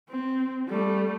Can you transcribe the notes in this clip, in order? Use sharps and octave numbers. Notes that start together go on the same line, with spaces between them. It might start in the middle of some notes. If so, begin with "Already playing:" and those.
C4
G3 A3